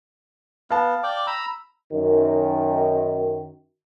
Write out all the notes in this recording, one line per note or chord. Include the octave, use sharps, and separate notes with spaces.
B3 F5 A5
D5 G5 D6
A#5 B5 E6
F#2 D#3